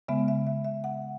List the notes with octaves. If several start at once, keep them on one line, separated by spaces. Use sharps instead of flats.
C#3 G#3 B3 E5
E5
E5
E5
F#5